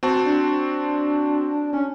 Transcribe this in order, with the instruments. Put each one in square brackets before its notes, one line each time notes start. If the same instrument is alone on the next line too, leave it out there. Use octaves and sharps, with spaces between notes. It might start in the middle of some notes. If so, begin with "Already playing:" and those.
[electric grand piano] C4 F#4 A5
[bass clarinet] D4
C#4